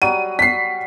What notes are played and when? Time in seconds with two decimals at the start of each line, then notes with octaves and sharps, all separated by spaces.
0.02 F#3 G3 D#7
0.39 B6 C7